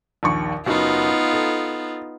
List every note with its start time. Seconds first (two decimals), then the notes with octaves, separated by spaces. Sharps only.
0.23 A#1 D#2 C#6
0.66 F#1 B3 D#4 F4 F#4
1.33 A4